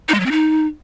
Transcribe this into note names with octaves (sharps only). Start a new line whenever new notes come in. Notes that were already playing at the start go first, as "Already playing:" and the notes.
D#4
G#3
F#3
C4
D#4